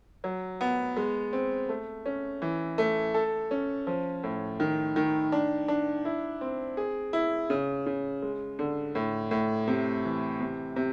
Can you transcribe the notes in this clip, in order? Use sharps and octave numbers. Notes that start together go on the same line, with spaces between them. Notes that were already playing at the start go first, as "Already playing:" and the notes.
F#3
B3
G#3
C4
A3
C#4
E3
A3
A4
C#4
F3
A2
D#3
D#3
D4
D4
E4
C4
G#4
E4
C#3
C#3
G#3
D3
A2
A2
C3
E3
C3
C3